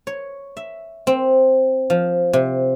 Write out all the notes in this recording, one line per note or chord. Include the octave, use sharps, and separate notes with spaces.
C#5
E5
C4
F3
C3